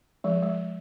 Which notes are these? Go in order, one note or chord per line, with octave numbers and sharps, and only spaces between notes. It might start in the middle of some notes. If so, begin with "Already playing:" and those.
F3 G#3
G#3